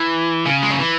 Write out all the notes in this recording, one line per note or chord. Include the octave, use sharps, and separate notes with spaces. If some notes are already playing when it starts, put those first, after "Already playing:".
Already playing: E3
C#3
G#3
F#3
E3